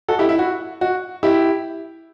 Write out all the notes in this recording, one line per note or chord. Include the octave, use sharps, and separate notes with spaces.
F#4 A4
E4 G4
E4
F#4
F#4
E4 G4